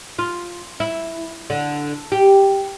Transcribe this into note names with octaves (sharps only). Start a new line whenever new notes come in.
F4
E4
D3
G4